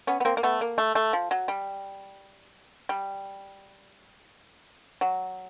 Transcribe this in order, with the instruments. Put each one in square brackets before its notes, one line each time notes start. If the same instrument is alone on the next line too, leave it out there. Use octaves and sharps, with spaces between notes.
[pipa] B3 C#4
B3
A#3 C4
A#3
A3 B3
A#3
A3
A3
F3
F#3
G3
G3
F#3